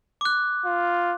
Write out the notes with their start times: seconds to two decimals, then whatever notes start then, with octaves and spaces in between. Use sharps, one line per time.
0.21 D6 F#6
0.66 F4